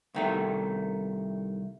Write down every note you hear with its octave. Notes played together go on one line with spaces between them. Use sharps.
C2 D#3 A3